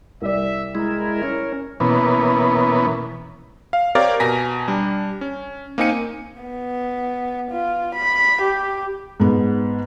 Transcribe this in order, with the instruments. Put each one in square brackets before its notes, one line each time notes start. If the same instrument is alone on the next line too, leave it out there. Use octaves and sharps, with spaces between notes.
[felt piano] C2 D5 [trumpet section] E5
[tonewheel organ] G#3 E4 [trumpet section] A#4
[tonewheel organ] C#4
[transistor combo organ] B2 E3 A#3 B3 C#4
[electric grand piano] F5
C4 G4 A#4 C#5 D5 F5
B2 G#5 A#5 A#6 B6
G3 D4
C#4
A#3 C4 D#4 G#5 C#7 D#7
[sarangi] B3
F4
B5
G4
[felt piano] G#2 B3